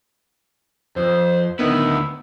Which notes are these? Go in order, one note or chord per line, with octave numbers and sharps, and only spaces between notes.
F2 C5
D2 D#3 B3 E4